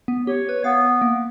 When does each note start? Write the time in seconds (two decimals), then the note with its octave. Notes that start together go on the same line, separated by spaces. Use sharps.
0.08 B3
0.27 G4 C#5
0.49 B4
0.64 B3 F5
1.02 A#3